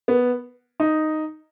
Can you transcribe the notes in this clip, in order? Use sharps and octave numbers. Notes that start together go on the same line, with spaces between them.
B3
D#4